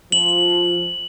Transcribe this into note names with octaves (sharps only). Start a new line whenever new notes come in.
F3 F#7